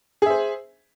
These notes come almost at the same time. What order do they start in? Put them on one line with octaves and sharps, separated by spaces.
G#4 E5 C5